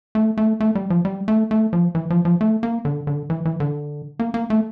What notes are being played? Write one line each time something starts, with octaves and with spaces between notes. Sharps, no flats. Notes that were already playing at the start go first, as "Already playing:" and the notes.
A3
A3
A3
G3
F3
G3
A3
A3
F3
E3
F3
F3
A3
A#3
D3
D3
E3
E3
D3
A#3
A#3
A3